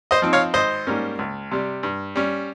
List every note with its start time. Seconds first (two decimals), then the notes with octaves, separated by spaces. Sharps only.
0.11 C5 D#5
0.22 F3 C4 D#4
0.33 C#5 F5
0.54 G#1 C5 D#5
0.87 G#2 G3 A#3 C#4
1.19 C#2
1.51 C3 G3
1.83 G2
2.16 G3 C#4